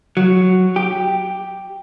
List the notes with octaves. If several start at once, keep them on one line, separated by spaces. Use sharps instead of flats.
F#3
G4